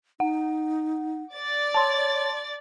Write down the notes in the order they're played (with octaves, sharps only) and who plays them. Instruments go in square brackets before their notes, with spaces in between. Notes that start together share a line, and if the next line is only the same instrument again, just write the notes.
[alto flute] D#4 [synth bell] F#5
[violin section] D5 A6
[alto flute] C#5 [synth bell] A5 C6